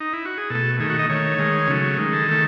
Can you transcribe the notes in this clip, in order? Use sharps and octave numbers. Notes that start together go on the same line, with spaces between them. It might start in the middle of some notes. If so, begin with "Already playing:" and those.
D#4
E4
F#4
G#4
B2 A3 A4
D#3 A3 G#4
F#4
D#5
D#3 A3 C#5
D#3 G#3
C#3 F#3 A3
D#3 G#3
A4
D#3 A3